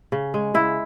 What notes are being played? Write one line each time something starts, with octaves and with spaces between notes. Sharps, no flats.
C#3
G#3
C#3 E4